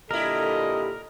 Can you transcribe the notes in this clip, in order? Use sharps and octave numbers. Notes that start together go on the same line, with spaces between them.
A#2 D3 G3 E4 A4 A#4 D#5